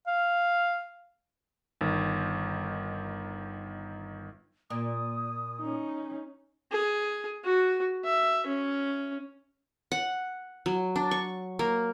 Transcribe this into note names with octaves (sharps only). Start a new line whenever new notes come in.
F5
G1 D#3
A#2 D#6
C#4 D#4
G#4
F#4
E5
C#4
F#5
F#3
D4
C#6
A#3